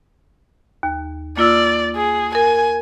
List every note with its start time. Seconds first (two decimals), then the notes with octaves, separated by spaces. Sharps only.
0.83 D#2
1.37 A#3 F4 D5 E6
1.96 G#4
2.35 A#4 G#5